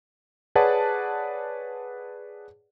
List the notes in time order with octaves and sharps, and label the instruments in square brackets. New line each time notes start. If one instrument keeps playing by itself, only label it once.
[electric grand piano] G#4 B4 C#5 D5 F#5 A5